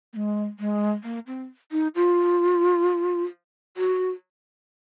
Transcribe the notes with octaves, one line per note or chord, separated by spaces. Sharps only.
A#3
G#3
G#3
A#3
C4
D#4
F4
F#4